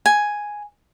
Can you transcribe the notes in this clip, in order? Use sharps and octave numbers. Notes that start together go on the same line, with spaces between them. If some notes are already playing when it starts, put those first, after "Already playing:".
G#5